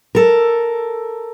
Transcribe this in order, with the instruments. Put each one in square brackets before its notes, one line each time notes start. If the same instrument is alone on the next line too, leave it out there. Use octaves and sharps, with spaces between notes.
[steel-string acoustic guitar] A4 A#4